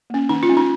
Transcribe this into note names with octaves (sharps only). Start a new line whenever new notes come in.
A#3 C#4
D#3 D#4
F4
G#3 C#4
D#4